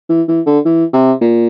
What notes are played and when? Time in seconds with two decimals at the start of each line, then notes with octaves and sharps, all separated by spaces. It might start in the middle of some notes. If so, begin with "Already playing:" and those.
0.09 E3
0.28 E3
0.46 D3
0.65 E3
0.93 C3
1.21 A#2